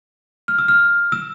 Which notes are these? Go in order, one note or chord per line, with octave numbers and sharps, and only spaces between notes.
F6
E6
F6
E6